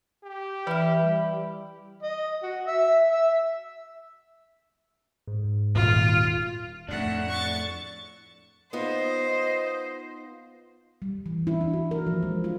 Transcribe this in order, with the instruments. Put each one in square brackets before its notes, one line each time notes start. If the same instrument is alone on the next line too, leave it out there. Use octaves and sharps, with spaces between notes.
[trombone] G4
[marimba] E3 F6 [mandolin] E4 [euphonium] B4
[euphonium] G3
[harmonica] D#5
F#4
E5
E5
[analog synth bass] G#2
[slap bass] D#1 [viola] F4
[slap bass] F2 A2 [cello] A3 F#5 [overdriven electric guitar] D4
[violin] C#6 A6
[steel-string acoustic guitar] B3 D#4 F4 [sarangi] C5 [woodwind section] D#5
[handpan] G3
E3
E4
D4
F#4
A#4
F3
G#3
F4